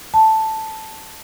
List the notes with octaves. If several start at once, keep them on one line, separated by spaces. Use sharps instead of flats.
A5